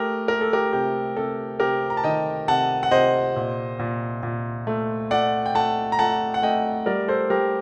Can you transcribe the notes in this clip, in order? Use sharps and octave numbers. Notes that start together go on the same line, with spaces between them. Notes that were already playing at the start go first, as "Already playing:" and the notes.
Already playing: A3 G4 A#4
A3 A#4
A4
G4 A#4
C3 G4
C3 A4
C3 G4 A#4
A#5
A5
D#3 D#5 G5
C3 F#5 A5
F#5
C3 C5 D#5
A#2
A#2
A#2
A3
A3 D5 F#5
G5
A3 F#5 A5
A#5
A3 F#5 A5
F#5
A3 D#5 G5
G3 A#4 D5
A4 C5
G3 G4 A#4